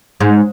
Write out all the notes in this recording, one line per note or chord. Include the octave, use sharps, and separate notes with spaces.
G#2